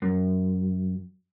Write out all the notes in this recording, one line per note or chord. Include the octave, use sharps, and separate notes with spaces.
F#2